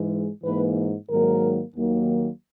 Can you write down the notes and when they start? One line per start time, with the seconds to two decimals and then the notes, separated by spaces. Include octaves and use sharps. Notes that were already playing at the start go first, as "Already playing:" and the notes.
Already playing: G#2 E3 G#3
0.43 G#2 E3 A#3 B4
1.09 G#2 D#3 F#3 A#3 A#4
1.75 D#2 D#3 F#3 A#3